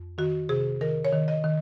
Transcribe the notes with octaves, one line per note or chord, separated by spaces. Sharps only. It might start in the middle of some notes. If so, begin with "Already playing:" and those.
Already playing: F2
D#3 F#4
C3 G#4
D#3 A#4
C#5
D#3
D#5
D#3